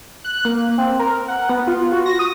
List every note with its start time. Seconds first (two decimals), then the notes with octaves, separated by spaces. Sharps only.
0.24 F#6
0.45 A#3
0.78 C4
0.99 A#4
1.28 F#5
1.49 B3
1.67 F4
1.92 F#4
2.06 A#6
2.19 D#6